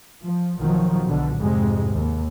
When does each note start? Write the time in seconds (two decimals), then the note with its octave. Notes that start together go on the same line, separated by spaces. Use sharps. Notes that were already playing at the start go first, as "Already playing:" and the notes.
0.24 F3
0.59 B1 D#3 F3 F#3
1.07 B1 B2 D3
1.37 F2 G#2 C3 G#3
1.92 D#2